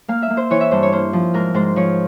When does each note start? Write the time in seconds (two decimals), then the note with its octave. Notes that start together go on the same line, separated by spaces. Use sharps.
0.08 A#3 F5
0.22 E5
0.30 A#3
0.37 C5
0.50 E3 C#5
0.61 E5
0.71 G2 C5
0.83 C#5
0.92 A#3 C5
1.13 F3
1.34 G#2 A#4
1.54 G#2 C5
1.76 F3 C#5